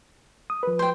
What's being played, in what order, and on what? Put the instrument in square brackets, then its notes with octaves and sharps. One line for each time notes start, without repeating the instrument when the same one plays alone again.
[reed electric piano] D#6
F3 B4
[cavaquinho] C5 G5